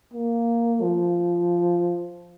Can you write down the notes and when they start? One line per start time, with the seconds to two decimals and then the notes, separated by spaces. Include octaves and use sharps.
0.14 A#3
0.82 F3